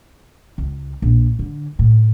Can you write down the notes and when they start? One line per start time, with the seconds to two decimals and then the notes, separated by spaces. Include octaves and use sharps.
0.58 C#2
1.02 A#1
1.39 D3
1.79 A2